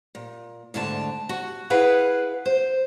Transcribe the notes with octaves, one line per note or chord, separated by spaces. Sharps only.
A#2
D2 G#2 D3 A5
F#4
E4 G#4 B4 F5 F#5
C5